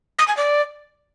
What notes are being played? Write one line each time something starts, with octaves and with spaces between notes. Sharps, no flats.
D#6
G#5
D5